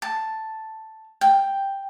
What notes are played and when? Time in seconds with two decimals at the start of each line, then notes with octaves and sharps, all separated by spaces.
0.02 A5
1.21 G5